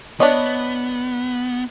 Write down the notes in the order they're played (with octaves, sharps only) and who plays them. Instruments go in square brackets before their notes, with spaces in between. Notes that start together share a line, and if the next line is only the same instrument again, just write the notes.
[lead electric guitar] B3 [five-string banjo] D4 C#5 D#5